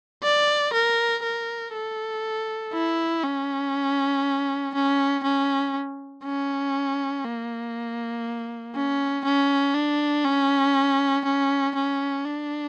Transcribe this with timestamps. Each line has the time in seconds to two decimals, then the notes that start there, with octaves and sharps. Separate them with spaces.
0.23 D5
0.73 A#4
1.23 A#4
1.74 A4
2.73 E4
3.23 C#4
4.74 C#4
5.23 C#4
6.24 C#4
7.24 A#3
8.74 C#4
9.25 C#4
9.74 D4
10.24 C#4
11.25 C#4
11.75 C#4
12.25 D4